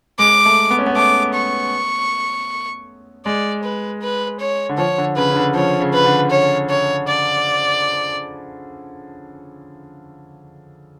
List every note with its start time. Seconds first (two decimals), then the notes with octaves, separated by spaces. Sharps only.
0.19 G#3 D6
0.45 A3
0.70 B3
0.79 C#4
0.86 B3
0.96 A3 D6
1.35 C#6
3.26 G#3 D5
3.64 B4
4.01 B4
4.40 C#5
4.69 D3
4.78 F3 C#5
4.98 D3
5.16 C#3 B4
5.30 C#3
5.36 D3
5.54 F3 C#5
5.80 C#3
5.93 B4
6.05 D3
6.31 C#5
6.69 C#5
7.08 D5